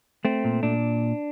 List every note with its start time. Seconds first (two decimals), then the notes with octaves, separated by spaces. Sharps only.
0.25 A3 C4
0.44 A#2
0.63 A#2 D4